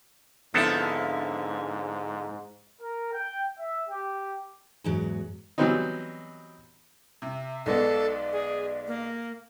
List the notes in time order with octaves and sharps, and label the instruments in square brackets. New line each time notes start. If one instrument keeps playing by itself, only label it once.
[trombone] G#2 [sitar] D3 F3 E4 [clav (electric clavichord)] B3 C4 A4
[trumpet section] A#4
G5
E5
G4
[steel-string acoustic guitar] E2 G#2 F#3
[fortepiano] E3 F#3 G3 B3 C4 D#4
[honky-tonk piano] C3 [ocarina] E5
[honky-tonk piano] B1 G#3 B3 [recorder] A4 [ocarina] D5
[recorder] G#4
A#3